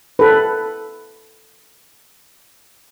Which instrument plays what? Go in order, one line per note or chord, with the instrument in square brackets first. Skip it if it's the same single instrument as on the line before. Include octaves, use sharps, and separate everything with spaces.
[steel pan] A4 B4